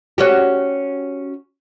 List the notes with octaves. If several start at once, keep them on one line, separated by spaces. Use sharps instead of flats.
C#4 F#4 G4